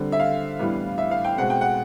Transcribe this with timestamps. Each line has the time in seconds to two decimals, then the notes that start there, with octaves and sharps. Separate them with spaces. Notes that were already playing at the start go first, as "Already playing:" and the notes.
Already playing: D3 G3 C4
0.12 E5
0.20 F5
0.59 A2 E3 G3 B3 D4
0.98 E5
1.11 F5
1.25 G5
1.38 B2 G#3 C4 F#5
1.50 G5
1.61 F#5